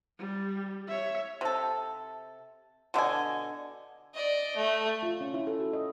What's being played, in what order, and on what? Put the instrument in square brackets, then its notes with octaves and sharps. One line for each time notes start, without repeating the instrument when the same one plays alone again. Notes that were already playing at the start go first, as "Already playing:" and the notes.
[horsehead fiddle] G3
C#5 E5
[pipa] C3 A4
B2 D3 D#5 G#5
[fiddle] D5 D#5
A3
[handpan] F4
C#4
E4
A4
F#4
D#5